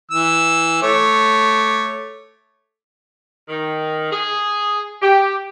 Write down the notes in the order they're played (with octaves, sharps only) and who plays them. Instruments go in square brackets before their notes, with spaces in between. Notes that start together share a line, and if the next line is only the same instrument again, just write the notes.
[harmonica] E3 E6
A3 C#5 D6
[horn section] D#3
G#4
G4